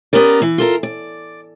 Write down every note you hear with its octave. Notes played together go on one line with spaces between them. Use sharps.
B3 C#4 G4 A#4 D5
E3
F4 A4 A#4
D5